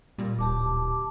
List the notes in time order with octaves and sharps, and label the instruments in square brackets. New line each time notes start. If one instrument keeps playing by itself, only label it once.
[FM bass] A#2 [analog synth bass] G3
[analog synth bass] D1 [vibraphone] G4 A5 D6